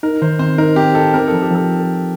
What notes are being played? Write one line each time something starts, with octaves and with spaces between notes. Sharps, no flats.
D#4 A#4
D#3 C5
C4 C5
D#4 A#4
C4 G4
D#4 A4
C4 A#4
F3 A4
G4
F3 A4